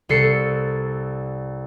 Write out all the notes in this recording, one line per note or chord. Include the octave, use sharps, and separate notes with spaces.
C2 A4 C7 C#7